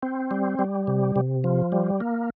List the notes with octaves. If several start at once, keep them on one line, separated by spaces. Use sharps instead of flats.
C4
G3
G3
C3
C3
F3
G3
A#3